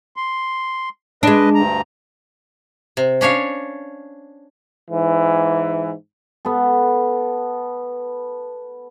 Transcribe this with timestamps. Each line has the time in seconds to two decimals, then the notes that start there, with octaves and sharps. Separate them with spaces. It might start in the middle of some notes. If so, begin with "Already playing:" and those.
0.16 C6
1.23 G#3 D4 B4 D#5
1.55 D2 G2 A#5
2.97 C3
3.21 C#4 D4 C#5 F5
4.90 G#2 E3
6.45 B3 A4